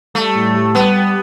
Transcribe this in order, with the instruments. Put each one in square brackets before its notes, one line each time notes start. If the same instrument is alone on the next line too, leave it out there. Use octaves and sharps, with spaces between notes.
[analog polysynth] G3 [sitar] A3
[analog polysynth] A2
G4
[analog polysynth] G3 [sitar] B3
[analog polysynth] G4